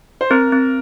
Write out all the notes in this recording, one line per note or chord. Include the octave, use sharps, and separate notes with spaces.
C5
C4 A#4
C4